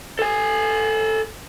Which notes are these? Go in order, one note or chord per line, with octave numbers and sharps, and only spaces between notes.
A4 G#5